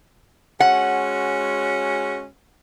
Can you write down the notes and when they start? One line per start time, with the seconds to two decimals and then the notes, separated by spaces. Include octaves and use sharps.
0.60 G#3 C#4 F#4 F#5